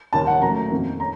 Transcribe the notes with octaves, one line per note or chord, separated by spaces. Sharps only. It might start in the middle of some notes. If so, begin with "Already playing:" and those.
D#2 D#3 A#3 A5
F#5
A#2 F#3 A3 A#5
F2 D#3 A#3
A#5